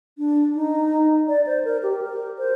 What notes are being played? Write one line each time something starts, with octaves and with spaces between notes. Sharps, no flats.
D4
D#4
D5
C5
A#4
G4
A#4
C5